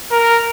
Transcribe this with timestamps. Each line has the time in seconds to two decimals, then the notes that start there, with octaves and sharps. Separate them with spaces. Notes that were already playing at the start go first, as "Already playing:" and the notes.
0.11 A#4